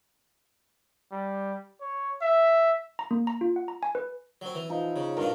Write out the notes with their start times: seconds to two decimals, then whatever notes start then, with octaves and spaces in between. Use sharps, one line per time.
1.12 G3
1.81 C#5
2.22 E5
2.99 A#5
3.11 A#3
3.27 A#5
3.41 F4
3.56 F#5
3.68 A#5
3.83 G#5
3.95 B4
4.41 F#3 C4
4.55 E3
4.69 F3 D#4
4.96 C#3
5.17 G2 B2 D4 A#4 F5